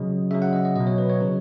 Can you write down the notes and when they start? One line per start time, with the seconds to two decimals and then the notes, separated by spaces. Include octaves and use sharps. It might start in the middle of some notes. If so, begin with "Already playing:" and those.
Already playing: C#3 F#3 D#5
0.31 C#3 F#3 E5
0.42 F#5
0.53 D#5
0.65 D#5
0.76 B2 F#3 D#5
0.87 C#5
0.98 B4
1.10 C#5
1.21 C#3 F#3